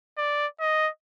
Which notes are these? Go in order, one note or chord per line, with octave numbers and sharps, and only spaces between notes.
D5
D#5